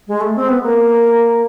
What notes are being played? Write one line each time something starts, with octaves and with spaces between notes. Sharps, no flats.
G#3
A3
C4
B3
A#3